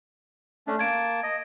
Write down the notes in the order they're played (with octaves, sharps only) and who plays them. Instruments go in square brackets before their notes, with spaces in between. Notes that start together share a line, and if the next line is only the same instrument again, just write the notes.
[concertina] A3 C#4 D4
[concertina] A#3 A5 [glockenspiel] G#6 D7
[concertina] D#5